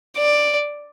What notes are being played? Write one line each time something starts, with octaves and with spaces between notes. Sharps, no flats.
D5